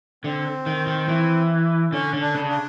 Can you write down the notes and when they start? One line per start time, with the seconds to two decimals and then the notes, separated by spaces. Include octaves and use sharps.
0.24 D3 C4
0.66 D#3
0.87 D#3
1.08 E3
1.92 D3 C#4
2.13 D3
2.21 D4
2.35 C#3
2.49 D4